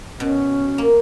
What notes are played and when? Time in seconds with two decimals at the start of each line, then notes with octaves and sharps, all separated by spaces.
0.20 B2 C#4
0.78 A#3